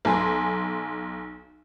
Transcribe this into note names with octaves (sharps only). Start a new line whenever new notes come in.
B1 G#5 C6